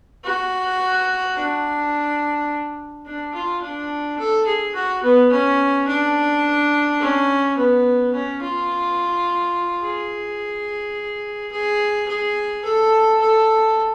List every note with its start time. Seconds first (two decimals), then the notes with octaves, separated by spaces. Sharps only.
0.24 F#4
1.37 D4
3.06 D4
3.34 F4
3.62 D4
4.19 A4
4.46 G#4
4.75 F#4
5.03 B3
5.32 C#4
5.88 D4
7.01 C#4
7.57 B3
8.14 C#4
8.42 F4
9.82 G#4
11.52 G#4
12.08 G#4
12.65 A4
13.21 A4